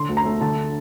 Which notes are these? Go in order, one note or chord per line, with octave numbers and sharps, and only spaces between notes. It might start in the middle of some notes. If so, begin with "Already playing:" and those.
Already playing: D3 C6
D2
A#5
A3
D3 A5